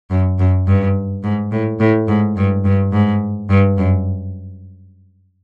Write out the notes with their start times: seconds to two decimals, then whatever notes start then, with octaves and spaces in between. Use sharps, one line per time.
0.11 F#2
0.39 F#2
0.67 G2
1.24 G#2
1.52 A2
1.80 A2
2.08 G#2
2.37 G2
2.65 G2
2.93 G#2
3.50 G2
3.78 F#2